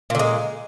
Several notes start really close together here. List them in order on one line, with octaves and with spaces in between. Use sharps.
A#2 D3 G#3